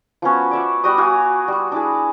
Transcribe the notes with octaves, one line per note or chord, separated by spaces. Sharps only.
F3 B3 C#4 F#4
D5 E5 F#5
G3 F#4 D5 D#6
F#4 F5 G#5
G3 F#4
D4 E4 G#4